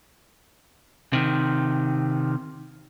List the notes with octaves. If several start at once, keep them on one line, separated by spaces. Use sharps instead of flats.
C3 D#3